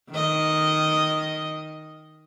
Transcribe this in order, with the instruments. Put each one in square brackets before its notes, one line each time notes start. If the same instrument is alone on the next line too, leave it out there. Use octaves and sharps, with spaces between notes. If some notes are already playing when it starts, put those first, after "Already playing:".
[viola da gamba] D#3 D#5